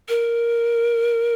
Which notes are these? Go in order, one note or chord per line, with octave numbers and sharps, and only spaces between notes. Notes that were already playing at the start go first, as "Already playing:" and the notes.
A#4